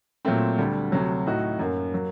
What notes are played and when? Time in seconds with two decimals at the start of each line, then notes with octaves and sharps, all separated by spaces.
0.25 A#2 F#3 A3 C4
0.58 D2 D3 G3
0.92 D2 C3 F#3
1.26 A2 A3 D#4 F#4
1.59 F#2 F#3 A#3
1.92 F#3 A#3